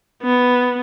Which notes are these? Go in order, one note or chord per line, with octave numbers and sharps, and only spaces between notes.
B3